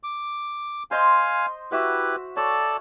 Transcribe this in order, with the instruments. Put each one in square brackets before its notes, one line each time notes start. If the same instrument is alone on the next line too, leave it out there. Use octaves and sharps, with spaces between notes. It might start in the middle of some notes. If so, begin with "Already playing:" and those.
[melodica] D6
[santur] C5 D#5 C6 [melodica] F5 G#5
[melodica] E4 G4 B4 [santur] F#4 E5 F#5
[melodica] A4 D5 A5 [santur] C#5